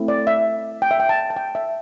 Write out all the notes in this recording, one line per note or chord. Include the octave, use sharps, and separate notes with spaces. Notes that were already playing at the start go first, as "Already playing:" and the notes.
Already playing: A3 C4 E4
D5
E5
G5
E5
G5
A5
A5
G5
E5